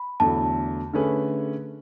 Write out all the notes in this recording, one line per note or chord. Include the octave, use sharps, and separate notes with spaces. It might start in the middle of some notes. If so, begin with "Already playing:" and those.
Already playing: B5
E2 D3 F#3 A3 A5
D3 A3 C#4 G#4 B4